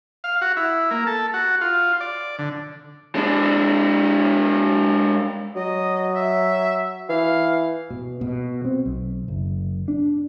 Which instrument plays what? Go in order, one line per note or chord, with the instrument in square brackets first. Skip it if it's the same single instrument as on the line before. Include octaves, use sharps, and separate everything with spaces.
[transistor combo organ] F5
F#4
E4
A#3
A4
F#4
F4
D5
D3
[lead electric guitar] G#3 D4
[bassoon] F#3 [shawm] D#5
[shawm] E5
[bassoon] E3 [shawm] F5
[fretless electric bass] B2
B2
C4
B1
F#1
D4